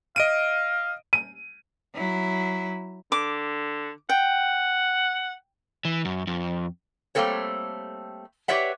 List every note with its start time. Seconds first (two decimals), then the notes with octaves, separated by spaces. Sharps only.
0.16 D#5 F5 D7 D#7
1.13 D#7
1.94 F#3 E4
3.12 D3 D6
4.09 F#5 G5
5.85 E3
6.05 F#2
6.27 F2
7.15 G3 A3 A#3 C4 A4 C#5
8.48 G4 B4 C#5 D5 E5 F#5